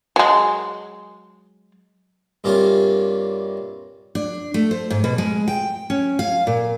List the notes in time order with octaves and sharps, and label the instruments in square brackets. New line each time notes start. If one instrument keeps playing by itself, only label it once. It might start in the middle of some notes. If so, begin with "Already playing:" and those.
[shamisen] F#3 G#3
[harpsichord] G2 C3 A#3 C#4 F4
[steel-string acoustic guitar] D4
A3
C5
G#2
B2
G#3
G5
C#4
F5
A#2